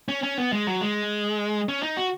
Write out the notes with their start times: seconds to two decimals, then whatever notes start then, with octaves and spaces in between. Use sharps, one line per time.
0.09 C#4
0.23 C#4
0.38 B3
0.53 G#3
0.67 F#3
0.81 G#3
1.69 C#4
1.83 D#4
1.97 F#4